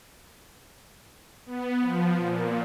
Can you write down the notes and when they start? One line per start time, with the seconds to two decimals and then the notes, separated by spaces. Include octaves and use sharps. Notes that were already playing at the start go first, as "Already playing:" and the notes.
1.46 B3
1.80 F3
2.16 A#2